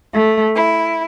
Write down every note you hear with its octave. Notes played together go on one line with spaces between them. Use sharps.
A3
E4